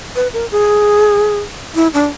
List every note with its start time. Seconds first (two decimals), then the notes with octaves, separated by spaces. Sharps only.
0.15 B4
0.33 A#4
0.51 G#4
1.75 E4
1.94 D4